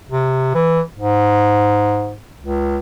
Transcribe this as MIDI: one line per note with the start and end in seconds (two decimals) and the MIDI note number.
0.09 0.50 48
0.54 0.81 52
0.98 2.15 44
2.43 2.77 37